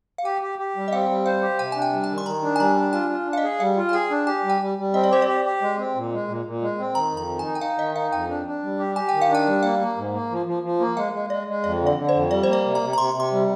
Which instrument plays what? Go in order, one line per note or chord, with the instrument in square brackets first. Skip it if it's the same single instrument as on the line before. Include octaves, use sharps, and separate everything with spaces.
[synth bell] F5
[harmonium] G4 [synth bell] G5
[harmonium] G4
G4
G3
[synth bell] D#5
[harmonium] C4 [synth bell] F5
[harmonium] G3
[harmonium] C5 [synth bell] F5
[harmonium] G4
[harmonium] C3 [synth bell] G5
[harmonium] D4 [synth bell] G#5
[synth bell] G5
[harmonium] G3
[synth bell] G#5
[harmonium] D#3
[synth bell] C6
[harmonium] D#3 [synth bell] A#5
[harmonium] D4
[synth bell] G#5
[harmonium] G3 [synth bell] A#5
[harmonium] D4
[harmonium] F4 [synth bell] G#5
[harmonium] F4
D4
[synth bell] F5
D#5
[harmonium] G#4
[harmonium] G3 [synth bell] F5
[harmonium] F4
[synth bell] G#5
[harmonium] G#4 [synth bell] G5
[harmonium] D4
[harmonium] G4 [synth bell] G#5
[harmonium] G3
[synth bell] G5
[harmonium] G3
G3
[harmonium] C4 [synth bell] D#5
[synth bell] D5
[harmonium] G4 [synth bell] C5
[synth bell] D5
[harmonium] G4
G4
G#3
C4
A#2
G#3
A#2
A#2
G#3
C4
[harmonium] D#3 [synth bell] A#5
[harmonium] F2
[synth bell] A#5
[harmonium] D#3
[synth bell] G#5
[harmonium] D#4
[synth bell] G5
[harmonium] D#4 [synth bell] F5
[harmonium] D#3 [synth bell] D#5
[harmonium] D#4 [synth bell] F5
[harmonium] F2 [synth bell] G5
[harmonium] D4
D4
G3
G4
[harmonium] G4 [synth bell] G#5
[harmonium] D#3 [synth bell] G5
[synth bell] F5
[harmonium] D4
[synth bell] G5
[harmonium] G3
[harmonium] A#3 [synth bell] F5
[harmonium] A#3
G#2
A#3
F3
F3
F3
A#3
[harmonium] G#3 [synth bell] F5
[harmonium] G#3
[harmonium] G#3 [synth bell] D5
[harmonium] G#3
[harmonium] F2 [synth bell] D5
[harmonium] D3
[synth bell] D5
[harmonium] D3
[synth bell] C5
[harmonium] F2
[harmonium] G3 [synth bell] D5
[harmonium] A#3 [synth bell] C5
[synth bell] D5
[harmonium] C3
[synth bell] A#5
[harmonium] C3
[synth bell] A#5
[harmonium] C3 [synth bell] C6
[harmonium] C3
[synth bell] C6
[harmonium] G3